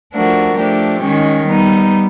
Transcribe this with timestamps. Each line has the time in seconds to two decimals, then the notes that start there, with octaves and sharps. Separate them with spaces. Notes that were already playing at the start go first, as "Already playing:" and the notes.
0.15 F3 A3 D4 F#4 A#4
0.58 F3 A3 D4 G4
1.03 D#3 G#3 C#4
1.47 G3 B3 D#4